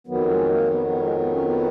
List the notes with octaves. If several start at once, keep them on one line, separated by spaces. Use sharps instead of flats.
F2 D#3 F#3 B3
G#3
A#3
B3
B3
G#3
B3
C#4
B3